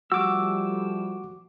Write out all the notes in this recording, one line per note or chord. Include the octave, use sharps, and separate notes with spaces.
F3 G3 A3 F#4 D6 E6